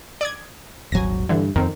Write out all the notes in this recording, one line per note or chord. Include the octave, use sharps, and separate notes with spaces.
D5 D#6 G#6
D#1 G#1 F#3 G#5 A#6
G2 D3 E3
F2 D#3 C4